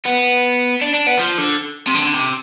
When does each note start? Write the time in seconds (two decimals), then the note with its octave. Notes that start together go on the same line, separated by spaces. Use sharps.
0.05 B3
0.81 D4
0.94 D4
1.06 B3
1.18 F3
1.38 D3
1.87 C3
1.95 D3
2.14 C3